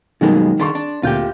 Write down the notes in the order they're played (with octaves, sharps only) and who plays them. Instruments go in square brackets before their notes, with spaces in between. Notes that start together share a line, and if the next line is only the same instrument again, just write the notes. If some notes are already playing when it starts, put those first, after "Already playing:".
[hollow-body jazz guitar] F#2 B2 G#3 [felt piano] D#3 G3 A#3
[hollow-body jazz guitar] D#3 D4 [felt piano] G#4 C6 C#6
[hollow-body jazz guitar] D4
[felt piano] D2 A#2 G6 [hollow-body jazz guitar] F4 G4